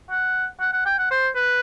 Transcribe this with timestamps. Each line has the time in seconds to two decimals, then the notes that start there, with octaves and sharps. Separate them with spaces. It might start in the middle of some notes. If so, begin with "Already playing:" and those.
0.10 F#5
0.60 F#5
0.73 F#5
0.85 G5
0.98 F#5
1.11 C5
1.36 B4